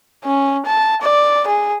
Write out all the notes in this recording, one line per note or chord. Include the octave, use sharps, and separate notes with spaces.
C#4
A5
D5
G#4